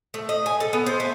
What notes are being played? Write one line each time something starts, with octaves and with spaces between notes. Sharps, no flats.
A3
D#5
G#5
A4
B3
C5
A3